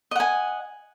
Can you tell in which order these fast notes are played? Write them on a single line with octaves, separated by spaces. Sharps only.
D#5 F#5 G#5